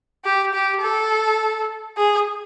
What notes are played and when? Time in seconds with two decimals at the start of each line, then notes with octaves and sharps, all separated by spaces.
0.25 G4
0.54 G4
0.82 A4
1.97 G#4